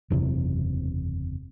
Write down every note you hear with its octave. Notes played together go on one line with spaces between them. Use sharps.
F#1 E2 C3